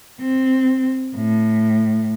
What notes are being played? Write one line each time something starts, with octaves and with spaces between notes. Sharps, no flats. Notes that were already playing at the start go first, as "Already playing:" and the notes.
C4
A2